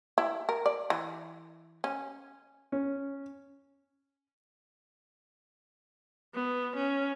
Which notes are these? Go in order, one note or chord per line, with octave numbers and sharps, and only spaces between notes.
E4
A#4
D5
E3
C#4
C#4
B3
C#4